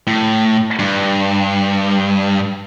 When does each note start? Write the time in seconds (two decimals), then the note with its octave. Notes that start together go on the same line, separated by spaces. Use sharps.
0.07 A2
0.79 G2